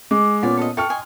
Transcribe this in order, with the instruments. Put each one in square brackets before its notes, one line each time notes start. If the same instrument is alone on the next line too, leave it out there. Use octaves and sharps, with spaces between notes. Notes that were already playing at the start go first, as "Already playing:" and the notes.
[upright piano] G#3 [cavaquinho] D6
[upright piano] A#2 B3 C#4 [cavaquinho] D5 G#5
[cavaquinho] A4 D#5
[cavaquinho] A4 [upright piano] G5 C#6 F6
[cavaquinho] D#5 G#5 C6